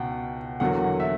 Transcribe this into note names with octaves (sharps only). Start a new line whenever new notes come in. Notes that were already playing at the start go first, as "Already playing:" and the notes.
Already playing: C#2 B2 F#5 G5
E2 D3 F#3 A#3 F#5
E5